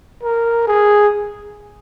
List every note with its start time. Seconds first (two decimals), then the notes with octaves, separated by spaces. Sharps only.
0.23 A#4
0.68 G#4